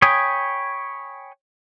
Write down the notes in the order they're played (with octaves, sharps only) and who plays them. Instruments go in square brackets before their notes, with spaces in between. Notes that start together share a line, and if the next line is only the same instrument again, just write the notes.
[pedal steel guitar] C#5 G5 G#5 B5 D#6